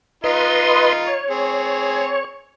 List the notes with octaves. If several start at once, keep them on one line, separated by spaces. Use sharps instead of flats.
D#4 F4 B4 D#5 C6
C#5
C4 G#4